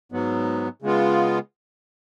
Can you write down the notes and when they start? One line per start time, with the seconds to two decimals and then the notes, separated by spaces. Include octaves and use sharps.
0.12 G#2 F#3 B3
0.82 C#3 G#3 B3 F4